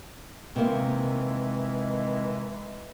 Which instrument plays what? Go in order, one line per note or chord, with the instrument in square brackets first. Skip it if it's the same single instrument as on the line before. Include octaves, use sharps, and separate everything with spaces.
[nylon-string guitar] C3 A#3 [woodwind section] D#3 E3 G#3